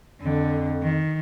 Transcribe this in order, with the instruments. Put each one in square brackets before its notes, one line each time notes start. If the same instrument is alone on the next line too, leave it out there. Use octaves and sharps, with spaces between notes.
[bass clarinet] F2 [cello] D3
[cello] D#3